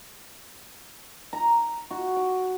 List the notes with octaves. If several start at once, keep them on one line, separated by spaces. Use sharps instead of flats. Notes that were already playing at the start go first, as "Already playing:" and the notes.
A#5
F#4
D6